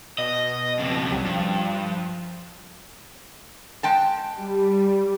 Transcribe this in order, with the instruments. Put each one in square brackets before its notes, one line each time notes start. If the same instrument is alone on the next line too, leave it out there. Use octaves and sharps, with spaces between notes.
[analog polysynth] B2 [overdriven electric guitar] D#5
[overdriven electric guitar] F2 C#3
[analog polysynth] C2 F#3 G3
[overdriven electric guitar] G2 [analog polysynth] F3
[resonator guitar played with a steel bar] G#3 G5 A5
[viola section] G3